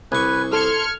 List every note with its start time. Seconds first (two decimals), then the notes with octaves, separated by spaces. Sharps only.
0.12 C2 B4 G#5 C#6
0.53 A4 C6 F6 G#6 C#7